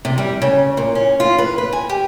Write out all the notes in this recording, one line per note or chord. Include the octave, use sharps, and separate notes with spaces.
C3
G3
C#3
A#2
C#4
F4
B4
B4
G#5
G4